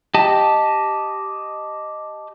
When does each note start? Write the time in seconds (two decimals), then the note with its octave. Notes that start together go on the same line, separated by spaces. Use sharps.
0.14 G4 D#5 A5